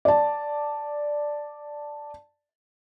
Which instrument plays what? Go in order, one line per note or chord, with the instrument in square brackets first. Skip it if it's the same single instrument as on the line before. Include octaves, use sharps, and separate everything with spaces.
[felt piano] D5 A5